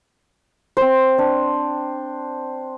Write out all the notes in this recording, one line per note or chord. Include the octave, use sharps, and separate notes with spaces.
C4 C5
D4